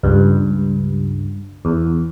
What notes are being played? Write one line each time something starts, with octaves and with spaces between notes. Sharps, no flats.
C#2 G2
E2